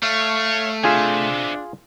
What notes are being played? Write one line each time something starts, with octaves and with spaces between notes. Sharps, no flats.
A3 C#5 F5
C4 D4 F4 G#4 E5 G#5